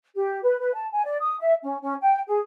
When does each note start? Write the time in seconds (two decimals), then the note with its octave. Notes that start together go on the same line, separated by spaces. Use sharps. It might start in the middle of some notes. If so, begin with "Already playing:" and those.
0.15 G4
0.43 B4
0.59 B4
0.73 A5
0.92 G#5
1.05 D5
1.21 D#6
1.39 E5
1.62 C#4
1.82 C#4
2.01 G5
2.28 G#4